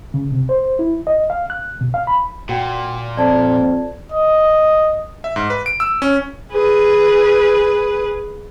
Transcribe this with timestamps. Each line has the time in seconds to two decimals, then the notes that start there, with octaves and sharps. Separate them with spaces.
0.14 C#3
0.32 C3
0.49 C5
0.79 E4
1.07 D#5
1.30 F5
1.50 F#6
1.81 B2
1.94 F5
2.07 B5
2.49 A#2 F#4 F#5 G5
3.17 F2 D5 A5 G#6
4.12 D#5
5.24 E5
5.36 G#2
5.50 B4
5.66 D7
5.80 E6
6.02 C#4
6.52 G#4 B4